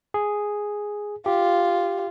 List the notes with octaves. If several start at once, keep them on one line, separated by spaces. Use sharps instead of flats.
G#4
F4 G4